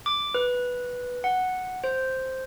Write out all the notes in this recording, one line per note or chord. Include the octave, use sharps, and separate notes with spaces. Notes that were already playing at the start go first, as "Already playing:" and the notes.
D6
B4
F#5
C5